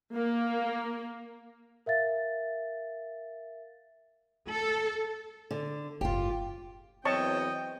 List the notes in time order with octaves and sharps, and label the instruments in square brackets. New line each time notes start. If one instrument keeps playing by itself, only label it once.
[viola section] A#3
[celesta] A#4 E5 F5 A6
[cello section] A4
[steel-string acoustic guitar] D3
[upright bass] F#1 G#2 [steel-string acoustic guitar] F4 G4
[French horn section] E2 F#3 C4 [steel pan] C#5 A5 C#6 [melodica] D#5 [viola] G5